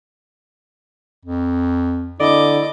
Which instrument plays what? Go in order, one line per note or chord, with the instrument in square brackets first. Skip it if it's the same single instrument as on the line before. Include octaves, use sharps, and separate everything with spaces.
[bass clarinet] F2
[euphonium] D3 [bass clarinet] E4 [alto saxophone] D5 [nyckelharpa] D#5 D6